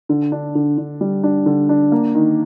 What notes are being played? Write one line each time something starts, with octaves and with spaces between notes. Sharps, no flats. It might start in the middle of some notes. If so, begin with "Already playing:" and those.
D3
D4
D3
D3
G3
D4
D3
D4
A#3
D#3